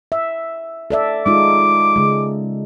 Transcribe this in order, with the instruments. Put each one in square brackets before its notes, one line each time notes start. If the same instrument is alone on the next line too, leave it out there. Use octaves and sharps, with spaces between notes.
[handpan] E5
A4 D5 E5
[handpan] G#3 D#4 F4 [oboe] D6
[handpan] C#3 G#3